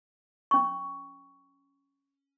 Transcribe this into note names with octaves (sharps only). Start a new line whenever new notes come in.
C#4 C#6